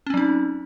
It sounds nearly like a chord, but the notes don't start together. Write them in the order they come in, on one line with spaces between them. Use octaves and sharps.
C#4 C4 F#3 D#4